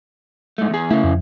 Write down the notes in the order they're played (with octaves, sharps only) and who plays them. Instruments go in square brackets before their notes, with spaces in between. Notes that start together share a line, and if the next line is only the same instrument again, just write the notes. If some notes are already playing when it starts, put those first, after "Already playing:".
[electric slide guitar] G#2 A3
E2 G#4
[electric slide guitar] C#3 E4 [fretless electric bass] A3
[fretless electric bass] F2